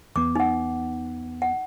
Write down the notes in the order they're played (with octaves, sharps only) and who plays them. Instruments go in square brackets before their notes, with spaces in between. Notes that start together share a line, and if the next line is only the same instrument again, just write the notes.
[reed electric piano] E2 B3 [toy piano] D6
[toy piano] D#4 F#5
F#5